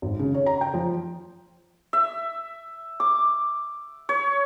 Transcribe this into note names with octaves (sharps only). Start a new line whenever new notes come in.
G#1
C#3
C#5
A#5
G5
F3
E5
D6
C#5